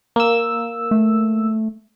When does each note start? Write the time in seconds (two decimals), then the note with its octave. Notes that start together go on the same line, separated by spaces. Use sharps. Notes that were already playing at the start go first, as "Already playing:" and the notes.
0.16 A#3 E6
0.91 A3